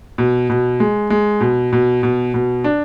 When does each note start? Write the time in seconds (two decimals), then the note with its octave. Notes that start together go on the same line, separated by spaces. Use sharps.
0.18 B2
0.50 B2
0.80 G#3
1.10 G#3
1.41 B2
1.73 B2
2.03 B2
2.34 B2
2.64 D4